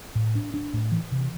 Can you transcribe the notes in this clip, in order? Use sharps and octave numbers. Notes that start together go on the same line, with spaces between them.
A2
D4
D4
A2
E3
C3